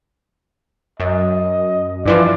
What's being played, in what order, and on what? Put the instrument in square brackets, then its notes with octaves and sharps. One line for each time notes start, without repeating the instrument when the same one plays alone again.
[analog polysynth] F#2 [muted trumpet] D#5
[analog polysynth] G2 E3 F3 [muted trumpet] D5